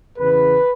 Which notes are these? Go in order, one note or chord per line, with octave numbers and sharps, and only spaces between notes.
E2 C#3 E3 B3 B4